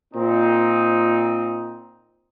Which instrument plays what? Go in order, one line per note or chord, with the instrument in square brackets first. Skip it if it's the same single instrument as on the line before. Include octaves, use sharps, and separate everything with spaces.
[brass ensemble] A#2 C4 D#4